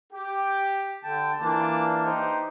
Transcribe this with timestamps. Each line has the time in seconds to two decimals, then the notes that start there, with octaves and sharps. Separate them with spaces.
0.13 G4
1.03 D3 G5 A5
1.40 E3 A#3 D4 F4 D5 A5
2.04 D#4 G4 C5